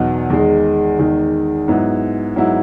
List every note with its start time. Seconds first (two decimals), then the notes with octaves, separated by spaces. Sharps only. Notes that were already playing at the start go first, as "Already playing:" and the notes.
Already playing: E2 B2 F#3 B3 D#4
0.30 E2 D#3 G#3
0.99 E2 D#3 G#3
1.68 G#2 F#3 B3 E4
2.36 G#2 F#3 B3 E4